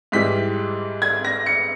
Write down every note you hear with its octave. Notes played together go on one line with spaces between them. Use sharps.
G#2 E3 G3 B6
G#6
A#6
C#7